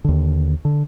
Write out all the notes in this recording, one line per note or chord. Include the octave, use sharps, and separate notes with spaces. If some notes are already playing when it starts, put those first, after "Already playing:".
D#2 D3
D3